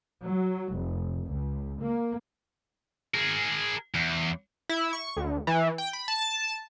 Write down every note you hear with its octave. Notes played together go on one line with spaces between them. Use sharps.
F#3
F1
C#2
A#3
G#4 A#4
E2
E4
C#6
D2
E3
G5
B5
A5